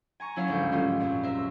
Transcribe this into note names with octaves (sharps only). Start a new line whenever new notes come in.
G#5 A#5 C#6
F#3 C#4 E4 C#5 F5
G#1 D2 G6
G#2 D#3 G3 A3 C#4 F4
C2 F#2 A#2
A#4 C5 E5